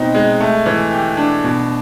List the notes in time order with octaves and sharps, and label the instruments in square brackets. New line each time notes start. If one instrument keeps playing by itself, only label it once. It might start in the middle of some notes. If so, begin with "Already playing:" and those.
Already playing: [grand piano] B2 C4 D#4
G#3
A3
E3
G4
D4
B2